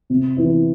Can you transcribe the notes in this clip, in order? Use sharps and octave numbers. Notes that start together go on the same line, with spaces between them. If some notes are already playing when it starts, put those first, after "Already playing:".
C3
E3 B3 E4